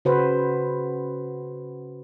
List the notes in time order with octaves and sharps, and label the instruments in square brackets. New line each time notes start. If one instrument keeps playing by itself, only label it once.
[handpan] C#3 F#4 B4 C5